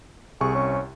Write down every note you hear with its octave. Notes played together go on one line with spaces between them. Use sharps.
C2 C3 G#4 C#6
C#4